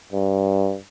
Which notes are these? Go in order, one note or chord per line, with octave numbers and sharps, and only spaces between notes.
G2